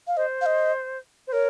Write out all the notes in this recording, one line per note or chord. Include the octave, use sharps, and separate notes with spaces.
F5
C5 D#5
F5
D#5
C5
A#4 C#5